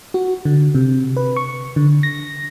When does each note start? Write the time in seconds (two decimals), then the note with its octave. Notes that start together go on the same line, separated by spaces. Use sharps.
0.14 F#4
0.45 D3
0.75 C3
1.17 B4
1.36 C#6
1.76 D3
2.03 A#6